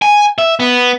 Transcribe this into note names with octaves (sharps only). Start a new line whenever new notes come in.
G#5
E5
B3